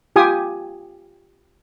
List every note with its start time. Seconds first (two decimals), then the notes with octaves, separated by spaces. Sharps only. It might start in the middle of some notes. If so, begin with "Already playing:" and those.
0.16 F4 G4 G#5 D#6